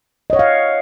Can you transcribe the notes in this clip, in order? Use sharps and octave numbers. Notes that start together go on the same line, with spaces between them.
C#5 D#5 F5 F#5